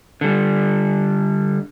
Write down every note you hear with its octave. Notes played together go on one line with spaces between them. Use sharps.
D3 G3